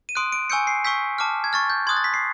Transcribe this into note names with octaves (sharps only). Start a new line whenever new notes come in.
D#7
C6 D#6 F#6 D7
D7
G#5 C#6 E6 G6 C#7
C7
C#6 E6 G6 B6
A5 D6 F6
G#6
C#6 F6 A6
G6
C6 D#6 F#6 G#6
A6
B6
C7